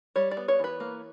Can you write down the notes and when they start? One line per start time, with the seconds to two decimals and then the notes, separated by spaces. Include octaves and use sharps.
0.16 G3 C#5
0.31 D5
0.37 B3
0.48 C#5
0.59 E3 B4
0.80 A#3